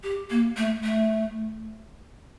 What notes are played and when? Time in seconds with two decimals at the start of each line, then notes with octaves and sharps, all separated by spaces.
0.03 G4
0.30 A#3
0.57 A3
0.84 A3